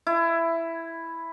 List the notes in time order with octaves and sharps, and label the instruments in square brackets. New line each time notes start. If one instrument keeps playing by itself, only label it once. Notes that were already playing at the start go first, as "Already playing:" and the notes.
[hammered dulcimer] E4